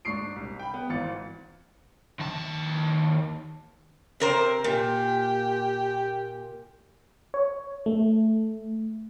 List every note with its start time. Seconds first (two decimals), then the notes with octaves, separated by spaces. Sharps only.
0.05 G#2 D4 C#6 D#6 C7 D7
0.36 C2
0.59 G5 B5
0.74 B3
0.89 G#1 E3 F4 A6 C#7
2.20 D#2 A5
4.20 C3 A#4 C5
4.64 A#2 G4
7.34 C#5
7.86 A3